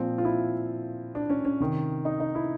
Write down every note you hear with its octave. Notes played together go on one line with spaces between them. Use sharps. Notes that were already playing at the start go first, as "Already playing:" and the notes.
Already playing: A#2 F3 C4
F4
E4
D4
C#4
C#4
C3 D#3
D#4
D#4
E4